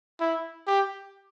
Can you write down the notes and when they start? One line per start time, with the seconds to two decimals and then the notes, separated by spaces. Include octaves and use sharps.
0.20 E4
0.67 G4